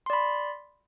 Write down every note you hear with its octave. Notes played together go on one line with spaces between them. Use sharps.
D5 B5 C6